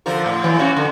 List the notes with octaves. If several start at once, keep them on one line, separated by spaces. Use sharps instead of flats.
D3 F3 A#4
A2
E3 F#3
A#3 C#4 F#4
D3